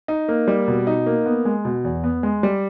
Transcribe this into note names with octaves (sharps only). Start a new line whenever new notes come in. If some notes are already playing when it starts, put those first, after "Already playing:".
D#4
A#3
G3
B2
D#4
A#3
B3
G#3
B2
E2
B3
G#3
G3